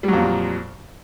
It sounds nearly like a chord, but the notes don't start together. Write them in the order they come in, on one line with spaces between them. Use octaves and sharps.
G3 F#3 F2 A#2